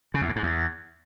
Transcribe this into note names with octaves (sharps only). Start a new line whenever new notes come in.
C#3
E2
A2
G#2
E2